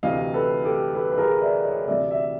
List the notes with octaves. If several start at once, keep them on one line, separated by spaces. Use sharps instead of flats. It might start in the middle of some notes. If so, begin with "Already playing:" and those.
D2 C3 E3 D#5 F5
A4 B4
G4 A4
A4 B4
B4
G#4 A#4
D5 E5
C#5 D#5
D2 C3 E3 D5 E5
D5 E5